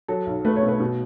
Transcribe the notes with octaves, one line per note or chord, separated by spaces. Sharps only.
F#3 A4
B1
A3 B4
C#5
B2
B4
B2